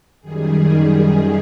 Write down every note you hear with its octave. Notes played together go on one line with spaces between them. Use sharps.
F#2 D#3 G3 G#4